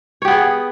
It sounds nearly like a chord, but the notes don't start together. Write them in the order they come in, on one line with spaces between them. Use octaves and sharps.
C#5 G4 B3 G#4